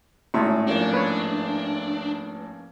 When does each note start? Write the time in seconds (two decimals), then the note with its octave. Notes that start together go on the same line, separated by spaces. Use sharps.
0.34 G#1 A2 C#4 E5 C6
0.67 F3 A#3 C#4 D4
0.93 B4 C#5